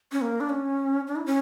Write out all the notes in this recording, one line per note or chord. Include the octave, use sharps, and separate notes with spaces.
C#4
A#3
D4
C#4
D4
E4
C#4